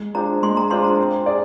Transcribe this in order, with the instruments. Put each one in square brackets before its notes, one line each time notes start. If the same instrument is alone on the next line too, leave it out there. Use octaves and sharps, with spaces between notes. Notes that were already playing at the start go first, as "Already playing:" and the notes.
Already playing: [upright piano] G#3
[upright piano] D4 F4 G#4 C5 [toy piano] A#5
[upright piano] G#3 [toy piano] C6
[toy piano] A#5
[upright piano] D4 F4 G#4 C5 [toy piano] C6
[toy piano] A#5
[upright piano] C4
G#4 D5